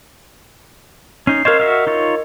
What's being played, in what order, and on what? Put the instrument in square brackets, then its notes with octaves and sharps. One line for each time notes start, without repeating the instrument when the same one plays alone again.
[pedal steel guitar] C#4 D#4 [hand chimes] C7
[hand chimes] A#4 D#5 [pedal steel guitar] C5 C#5 F5
[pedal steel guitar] F#4 E5 F5
D#4 F4 C#5